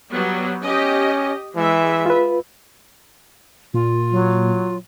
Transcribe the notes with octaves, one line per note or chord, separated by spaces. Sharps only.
F#3 G3 B3
C#4 G4 D#5
E3 G#3 E5
F4 B4
A#2 F4
F#3